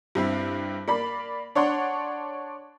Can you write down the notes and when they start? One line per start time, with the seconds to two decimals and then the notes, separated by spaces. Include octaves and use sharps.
0.15 G2 C4 E4
0.88 A#3 D5 B5
1.55 D4 C#5 D5 F#5 C6